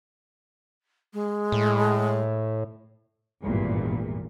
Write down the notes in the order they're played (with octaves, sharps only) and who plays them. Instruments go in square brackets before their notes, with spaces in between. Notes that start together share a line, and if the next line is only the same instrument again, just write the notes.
[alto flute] G#3
[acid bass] A2
[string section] G#1 E2 G2 A#2